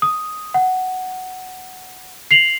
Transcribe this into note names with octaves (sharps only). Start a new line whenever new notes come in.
D#6
F#5
C7 F7 F#7